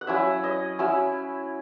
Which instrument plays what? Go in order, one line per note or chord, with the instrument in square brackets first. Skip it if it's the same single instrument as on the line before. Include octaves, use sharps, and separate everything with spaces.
[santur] F#5
F#3 C#4 E4 E5
D#5
F#3 C#4 E4 E5